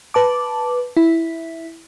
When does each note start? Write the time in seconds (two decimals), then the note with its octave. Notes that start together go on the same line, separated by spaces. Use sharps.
0.14 B4 A5 D6
0.97 E4